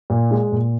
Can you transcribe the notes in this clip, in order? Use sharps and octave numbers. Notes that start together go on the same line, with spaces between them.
A#2
G#3
A#2